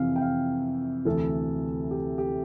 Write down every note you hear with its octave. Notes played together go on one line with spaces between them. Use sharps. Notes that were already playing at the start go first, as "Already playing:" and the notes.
Already playing: F2 C3 E3 F5
G5
F5
D2 C3 E3 A4
G4
G4